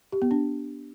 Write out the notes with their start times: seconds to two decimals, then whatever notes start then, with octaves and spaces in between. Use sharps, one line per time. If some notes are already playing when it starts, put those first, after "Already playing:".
0.12 G4
0.22 B3
0.31 D4